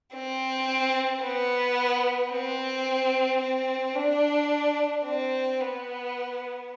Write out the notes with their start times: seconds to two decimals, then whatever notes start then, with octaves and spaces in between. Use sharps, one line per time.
0.15 C4
1.23 B3
2.32 C4
3.42 C4
3.95 D4
5.04 C4
5.60 B3